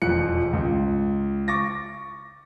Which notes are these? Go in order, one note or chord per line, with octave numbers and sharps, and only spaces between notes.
E1 F2 F3 F#6 C#7
C#2
C#6 D6 A6 A#6